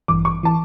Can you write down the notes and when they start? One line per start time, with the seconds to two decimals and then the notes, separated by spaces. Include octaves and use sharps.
0.08 A1 G2 E3 D6
0.25 C#6
0.43 E3 A5